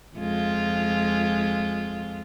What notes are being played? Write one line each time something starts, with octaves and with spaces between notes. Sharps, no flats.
F2 G#3 F4